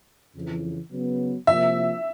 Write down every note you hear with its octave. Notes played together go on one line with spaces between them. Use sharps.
F2 C#3 E3
C#3 F#3 B3
C3 F3 A#3 E5